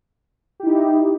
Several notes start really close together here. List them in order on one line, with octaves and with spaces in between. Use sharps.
G4 E4 D#4